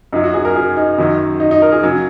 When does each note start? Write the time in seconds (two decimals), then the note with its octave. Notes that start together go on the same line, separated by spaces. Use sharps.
0.13 F#2 F#3 D#4
0.24 F#4
0.34 G#4
0.45 A#4
0.56 G#4
0.77 D#4
0.98 F#2 D#3 F#3
1.40 D#4
1.51 D#4
1.62 A#4
1.72 G#4
1.83 C#3 F#3